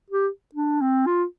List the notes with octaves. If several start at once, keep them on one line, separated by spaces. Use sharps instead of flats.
G4
D4
C4
F4